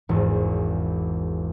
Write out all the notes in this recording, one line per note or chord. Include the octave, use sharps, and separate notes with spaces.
G#1 E2